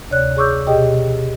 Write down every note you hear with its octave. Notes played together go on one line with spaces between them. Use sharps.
D2 C3 C#5 D5 F#6
G#4 C#5 C#6 D6 E6 G6
B2 G4 G#4 D#5 G5